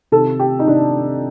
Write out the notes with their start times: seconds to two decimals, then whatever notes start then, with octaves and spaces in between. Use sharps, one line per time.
0.12 C3 D#3 A4
0.40 G4
0.59 D#4
0.67 C3 D#3 D4